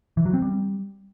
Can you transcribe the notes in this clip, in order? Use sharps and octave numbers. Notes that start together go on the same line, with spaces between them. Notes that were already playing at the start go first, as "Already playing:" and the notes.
E3
F#3
C4
G3